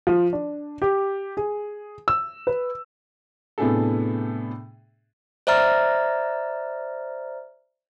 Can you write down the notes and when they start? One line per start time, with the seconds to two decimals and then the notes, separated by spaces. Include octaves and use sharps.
0.07 F3
0.33 D4
0.82 G4
1.37 G#4
2.08 E6
2.47 B4
3.58 A2 C3 B3 D4 G#4 A4
5.47 C5 D5 E5 A#5 F6 A6